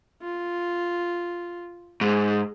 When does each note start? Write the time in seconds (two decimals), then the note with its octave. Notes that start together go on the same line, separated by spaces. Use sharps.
0.22 F4
2.01 G#2 G#4